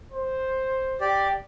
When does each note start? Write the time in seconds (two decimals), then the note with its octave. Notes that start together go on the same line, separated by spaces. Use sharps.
0.12 C5
1.01 G4 D5